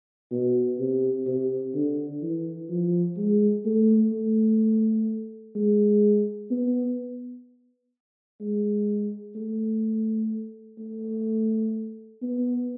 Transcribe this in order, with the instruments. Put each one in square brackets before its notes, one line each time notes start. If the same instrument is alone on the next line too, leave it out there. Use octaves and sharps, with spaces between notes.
[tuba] B2
C3
C3
D3
E3
F3
G#3
A3
A3
G#3
B3
G#3
A3
A3
B3